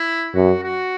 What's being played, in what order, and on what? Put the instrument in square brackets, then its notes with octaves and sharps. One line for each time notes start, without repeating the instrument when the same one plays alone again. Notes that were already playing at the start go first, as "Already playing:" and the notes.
Already playing: [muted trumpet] E4
[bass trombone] F#2 [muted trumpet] F#4
[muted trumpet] F#4